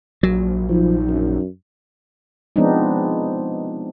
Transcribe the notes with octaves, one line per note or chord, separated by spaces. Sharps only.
A#1 F#3
F3 D#4
F#2
F3 G#3 B3 C4 D4 D#4